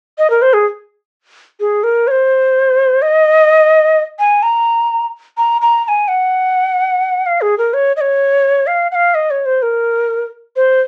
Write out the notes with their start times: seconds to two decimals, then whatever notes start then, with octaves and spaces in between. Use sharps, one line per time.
0.18 D#5
0.30 A#4
0.42 C5
0.53 G#4
1.60 G#4
1.84 A#4
2.07 C#5
2.11 C5
3.02 D#5
4.19 G#5
4.43 A#5
5.37 A#5
5.62 A#5
5.85 A#5
5.88 G#5
6.08 F#5
7.26 F5
7.41 G#4
7.58 A#4
7.74 C#5
7.97 D#5
8.01 C#5
8.67 F5
8.92 F#5
8.95 F5
9.15 D#5
9.31 C#5
9.46 C5
9.62 A#4
10.56 C5